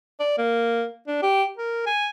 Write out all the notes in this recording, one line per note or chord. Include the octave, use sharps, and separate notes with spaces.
D5
A#3
D4
G4
A#4
G#5